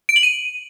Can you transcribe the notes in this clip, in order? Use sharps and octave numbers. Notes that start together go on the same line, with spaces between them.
D7
F#7
D#7